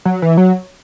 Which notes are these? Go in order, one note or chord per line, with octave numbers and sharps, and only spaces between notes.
F#3
E3
F#3